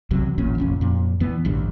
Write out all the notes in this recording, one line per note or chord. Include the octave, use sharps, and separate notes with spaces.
B1 E2 C3 F#3
A1 E2 A#2 C#4
F1 A#1 C#4
F2 A#2
E2 E3 B3
A1 D2 G2